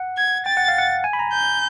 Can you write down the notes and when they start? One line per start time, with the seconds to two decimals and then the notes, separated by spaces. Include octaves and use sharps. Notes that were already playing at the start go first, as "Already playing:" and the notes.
Already playing: F#5
0.17 G#6
0.46 G5 A6
0.57 F#5
0.68 F5
0.78 F#5
1.04 G#5
1.13 B5
1.19 A#5
1.33 G6